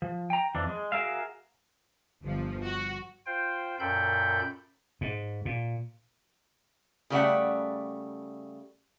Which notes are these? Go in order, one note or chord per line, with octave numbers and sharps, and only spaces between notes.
F3
G5 A#5
F2 E3 D4
G#3
F#4 G#4 A#4 E5 F5
G1 F3
F#4
F4 C5 G5
F#2 A#2 A4 G5 B5 G6
G#2
A#2
C#3 G3 A3 D5 E5 F#5